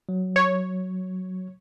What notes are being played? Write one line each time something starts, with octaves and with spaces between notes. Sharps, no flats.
F#3
C#5